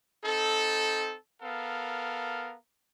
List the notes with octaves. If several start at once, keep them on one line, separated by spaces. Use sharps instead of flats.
C4 D#4 A4
B3 A4 A#4 F5